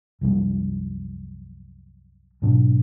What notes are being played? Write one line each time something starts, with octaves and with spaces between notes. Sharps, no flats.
C2 F#2 F3 G3
G#2 B2 F#3 D4